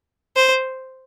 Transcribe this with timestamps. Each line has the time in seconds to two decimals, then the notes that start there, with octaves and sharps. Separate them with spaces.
0.36 C5